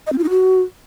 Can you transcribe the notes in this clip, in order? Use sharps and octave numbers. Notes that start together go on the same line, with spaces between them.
D#5
C4
F4
D#4
F#4